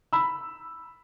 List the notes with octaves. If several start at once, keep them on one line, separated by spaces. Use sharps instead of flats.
B5 E6